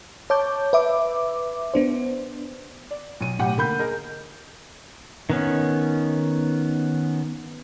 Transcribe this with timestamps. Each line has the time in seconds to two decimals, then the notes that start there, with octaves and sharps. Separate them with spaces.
0.30 C#5 A5 D6 G6
0.73 B4 E5 D6
1.74 B3 D4 C5
2.91 D5
3.21 B1 D#7
3.39 B1 A2 G4 F#5 G5
3.57 D3 A#3 B5 G6
3.79 G#4 A#4 D#5
5.30 D#3 B3 C#4